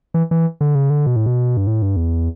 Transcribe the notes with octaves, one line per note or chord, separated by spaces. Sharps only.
E3
E3
D3
C#3
D3
B2
A2
B2
G2
A2
G2
E2